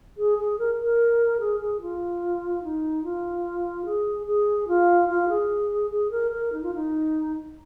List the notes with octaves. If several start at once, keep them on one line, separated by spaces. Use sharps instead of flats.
G#4
G#4
A#4
A#4
G#4
G#4
F4
D#4
F4
G#4
G#4
F4
F4
G#4
G#4
A#4
A#4
D#4
F4
D#4